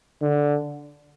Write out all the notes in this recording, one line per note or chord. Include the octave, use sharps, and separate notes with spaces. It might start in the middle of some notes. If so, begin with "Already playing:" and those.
D3